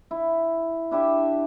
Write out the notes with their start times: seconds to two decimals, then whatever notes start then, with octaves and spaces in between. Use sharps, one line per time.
0.11 E4
0.91 D4 E4 G4 E5